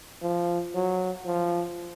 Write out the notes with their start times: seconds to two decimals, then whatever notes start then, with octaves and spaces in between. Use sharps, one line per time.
0.22 F3
0.75 F#3
1.26 F3